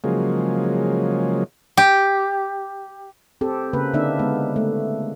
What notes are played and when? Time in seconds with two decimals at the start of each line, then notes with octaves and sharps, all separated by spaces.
0.04 C#3 F3 F#3 G#3 A#3
1.77 G4
3.41 C4 G4 A4
3.73 C#3 A#3 B4
3.94 D3 A#3 C4 D4 D#4 E5
4.19 G#3 B3
4.56 A3